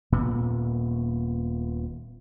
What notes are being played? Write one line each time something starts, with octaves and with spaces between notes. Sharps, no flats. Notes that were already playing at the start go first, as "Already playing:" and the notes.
D#1 A#2 B3